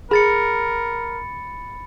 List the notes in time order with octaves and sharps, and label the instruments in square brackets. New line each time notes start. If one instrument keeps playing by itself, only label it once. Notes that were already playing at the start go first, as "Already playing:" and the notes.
[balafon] G#4 [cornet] A#4 [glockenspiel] B5 A6 C#7